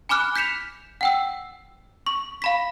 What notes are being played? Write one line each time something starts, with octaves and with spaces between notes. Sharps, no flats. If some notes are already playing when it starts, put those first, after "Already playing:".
G#5 B5 D6 F6 F#6
G6 B6 C#7 E7 F7
F#5 G5 E6
C#6
F5 B5 B6